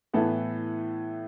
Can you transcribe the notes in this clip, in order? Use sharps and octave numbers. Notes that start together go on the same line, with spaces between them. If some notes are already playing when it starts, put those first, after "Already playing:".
A2 E3 B3 E4 A4